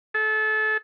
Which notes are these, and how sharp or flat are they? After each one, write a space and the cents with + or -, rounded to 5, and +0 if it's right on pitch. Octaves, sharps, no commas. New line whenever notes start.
A4 -30